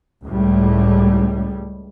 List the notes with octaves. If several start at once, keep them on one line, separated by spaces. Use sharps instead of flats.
C#2 A2 G3